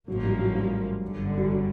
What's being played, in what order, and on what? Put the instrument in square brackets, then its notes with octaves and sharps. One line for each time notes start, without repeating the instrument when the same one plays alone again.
[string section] A1 G#2 F3 A#3 [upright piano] F#3
[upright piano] G3
F#3
G3
[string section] G1 F#2 D3
[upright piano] G3
F#3